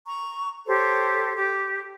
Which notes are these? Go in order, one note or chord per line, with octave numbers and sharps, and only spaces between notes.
A#5 C#6
G4 A4 C5 C#5
G4